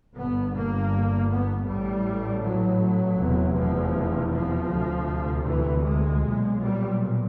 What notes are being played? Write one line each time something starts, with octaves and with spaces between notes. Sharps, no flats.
G1 G2 B3
A#3
B3
A1 A2 G3
F#3
F1 E2 C3
F3
F3
D2 C3
E3
G#3
B1 A#2
G3